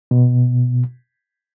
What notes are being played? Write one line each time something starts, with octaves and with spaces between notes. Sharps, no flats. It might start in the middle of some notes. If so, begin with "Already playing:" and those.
B2